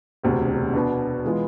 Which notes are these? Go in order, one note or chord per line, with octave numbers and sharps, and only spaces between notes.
E1 D2 C3
B2 B3 D4
E3 G#3 B3 F4